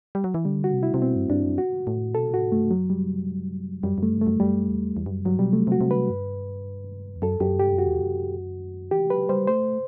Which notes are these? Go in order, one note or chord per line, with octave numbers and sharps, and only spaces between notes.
G3
F#3
E3
D3 G3
F#4
C3
E4
C3
B2 C4
G2
G2 D4
F#2
F#4
A2
B2 A4
A2 F#4
G2 A3
F#2 F#3
G3
F#2 G3
F#2 A3
G2
A3
F#2
F#2 G3
E2
E2
G2
F#2
G2 F#3
B2 G3
C3 A3
C3
F#4
C3
C3 D3 B4
G2
E2
F#2 A4
F#2 G4
G2 G4
F#2
F#4
E2
F#2
E3 G4
F#3 B4
G3 C5
A3 C5